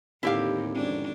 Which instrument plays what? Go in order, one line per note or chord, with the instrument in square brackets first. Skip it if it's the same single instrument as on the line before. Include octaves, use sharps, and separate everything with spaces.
[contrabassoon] D#2 [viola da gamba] A2 D3 C4 [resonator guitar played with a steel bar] E4 G4 F5
[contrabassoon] G#1 [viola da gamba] F2 C#4 D4